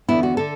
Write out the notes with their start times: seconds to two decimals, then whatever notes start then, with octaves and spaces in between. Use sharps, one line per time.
0.08 E2 D3 B3 E4
0.23 F#4
0.37 D3 A4